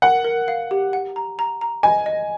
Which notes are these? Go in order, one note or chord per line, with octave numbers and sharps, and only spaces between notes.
A#4 F#5
A#4
F5
G4
F#5
A#5
A#5
A#5
D#5 G#5
D#5